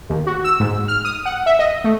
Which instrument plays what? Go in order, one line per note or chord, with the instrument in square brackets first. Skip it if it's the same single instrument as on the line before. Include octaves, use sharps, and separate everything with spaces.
[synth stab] D#2
F#4
E6
G#2
F6
D#6
F#5
E5
D#5
A3